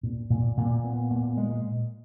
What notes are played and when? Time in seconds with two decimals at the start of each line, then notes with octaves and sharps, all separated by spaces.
0.03 A#2
0.30 A#2
0.57 A#2
0.84 B3
1.10 A#2
1.37 G#3